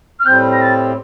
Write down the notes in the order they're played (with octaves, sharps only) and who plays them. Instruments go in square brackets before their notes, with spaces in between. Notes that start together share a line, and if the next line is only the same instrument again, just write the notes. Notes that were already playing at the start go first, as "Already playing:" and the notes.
[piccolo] F6
[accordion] A2 G3 C4 [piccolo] G6
[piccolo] A#6
A6